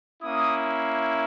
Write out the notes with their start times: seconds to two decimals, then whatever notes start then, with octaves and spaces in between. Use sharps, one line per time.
0.21 A#3 C#4 E4 D#6